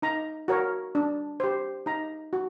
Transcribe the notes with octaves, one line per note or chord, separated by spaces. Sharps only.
D#4 A#5
F#4 A#4 C#5
D4
G4 C5
D#4 A#5
F#4